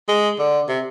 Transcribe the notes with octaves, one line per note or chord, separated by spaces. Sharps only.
G#3
D3
C3